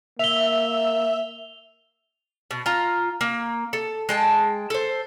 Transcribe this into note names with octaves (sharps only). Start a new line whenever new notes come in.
A#3 E5 F7 G7
B2
F4 A#5
A#3
A4
G#3 G5 A5
A4 C5